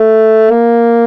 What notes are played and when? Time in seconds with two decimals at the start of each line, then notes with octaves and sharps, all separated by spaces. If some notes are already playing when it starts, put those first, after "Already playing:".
Already playing: A3
0.50 A#3